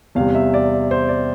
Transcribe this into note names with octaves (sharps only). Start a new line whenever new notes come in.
E2 C3 G3 F5
E5
D5
C5
D5